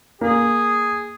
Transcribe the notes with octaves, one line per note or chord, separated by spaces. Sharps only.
A#3 G#4